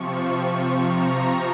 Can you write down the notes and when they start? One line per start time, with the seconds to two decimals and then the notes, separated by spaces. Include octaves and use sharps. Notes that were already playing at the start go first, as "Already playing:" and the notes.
Already playing: C3 F3 C#6
0.80 A#5